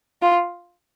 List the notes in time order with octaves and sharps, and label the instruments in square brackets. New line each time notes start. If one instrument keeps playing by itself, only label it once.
[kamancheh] F4